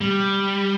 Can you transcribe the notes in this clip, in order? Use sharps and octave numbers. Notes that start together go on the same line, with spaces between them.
G3